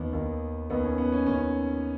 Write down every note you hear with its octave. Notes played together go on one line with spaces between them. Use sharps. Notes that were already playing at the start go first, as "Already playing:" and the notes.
Already playing: D#2 D#3 B3
D#2 D#3
D#2 D#3 B3
C#4
B3
C#4
D#2 D#3 C#4